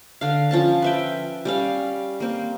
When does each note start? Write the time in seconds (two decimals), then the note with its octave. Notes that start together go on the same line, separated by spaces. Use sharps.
0.21 D3 F5
0.51 F3 C#4 A5
0.82 B4 E5 G5
1.45 G3 C#4 F5
2.20 A#3 C4